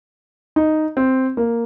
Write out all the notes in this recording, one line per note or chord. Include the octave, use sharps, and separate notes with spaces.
D#4
C4
A#3